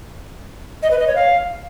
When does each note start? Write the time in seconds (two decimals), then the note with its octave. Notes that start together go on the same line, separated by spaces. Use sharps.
0.83 D#5
0.91 B4
0.99 D#5
1.07 C#5
1.16 F5